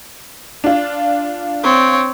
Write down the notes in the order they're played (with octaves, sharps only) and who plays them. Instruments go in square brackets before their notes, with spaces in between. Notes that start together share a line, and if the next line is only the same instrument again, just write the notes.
[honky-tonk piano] D4 F4
[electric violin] C4 C#5